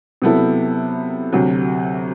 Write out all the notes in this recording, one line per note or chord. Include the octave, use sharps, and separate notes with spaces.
C3 F#3 B3 E4 A4
D2 C3 F#3